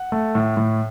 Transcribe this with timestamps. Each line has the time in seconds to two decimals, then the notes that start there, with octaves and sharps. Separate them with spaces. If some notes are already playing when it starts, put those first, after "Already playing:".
Already playing: F#5
0.12 A3
0.35 A2
0.57 A2